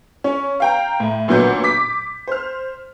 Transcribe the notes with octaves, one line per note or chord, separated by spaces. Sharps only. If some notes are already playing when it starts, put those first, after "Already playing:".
C#4
F5 G5 A#5
A2
A1 A#2 D3 F#3 B3 G6
D6 B6
C5 F6